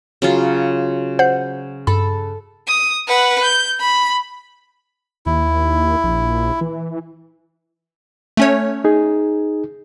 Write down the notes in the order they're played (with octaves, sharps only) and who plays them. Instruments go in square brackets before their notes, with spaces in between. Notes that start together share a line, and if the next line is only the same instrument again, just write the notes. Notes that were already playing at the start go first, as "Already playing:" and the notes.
[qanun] C#3 F#3 F4
[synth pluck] C5 F#5 G6
[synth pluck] G2 B5 [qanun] A4
[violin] D#6
B4 F#5
G6
B5
[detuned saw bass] D#2 [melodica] E4
[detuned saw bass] A#1
E3
[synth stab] A3 C#4 C#5
[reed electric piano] D#4 G#4